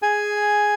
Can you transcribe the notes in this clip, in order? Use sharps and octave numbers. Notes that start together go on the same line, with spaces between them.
G#4 G#5